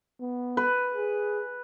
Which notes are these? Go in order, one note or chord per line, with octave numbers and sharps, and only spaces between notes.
B3
B4
G#4